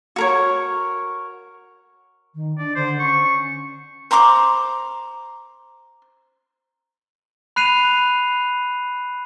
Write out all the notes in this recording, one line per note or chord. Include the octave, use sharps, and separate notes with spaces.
F#4 A#4 C#5
D#3
D4 D5
D3 C5
C#4 C#6
C5 A#5 C6 D6
B5 F#6 C7 D#7 F7